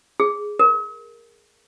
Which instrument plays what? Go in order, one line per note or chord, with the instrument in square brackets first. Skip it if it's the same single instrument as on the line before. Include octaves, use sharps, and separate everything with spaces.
[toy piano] G#4
A#4